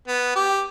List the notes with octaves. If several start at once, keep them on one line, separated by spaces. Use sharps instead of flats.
B3
G4